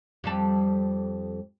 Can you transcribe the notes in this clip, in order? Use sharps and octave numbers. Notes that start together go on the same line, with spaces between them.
F2 G3 A4